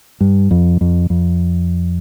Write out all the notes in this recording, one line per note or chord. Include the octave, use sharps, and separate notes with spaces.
G2
F2
F2
F2